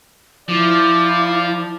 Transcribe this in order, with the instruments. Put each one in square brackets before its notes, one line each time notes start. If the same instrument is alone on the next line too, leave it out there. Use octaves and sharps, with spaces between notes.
[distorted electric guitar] F3 [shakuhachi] E4 [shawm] D5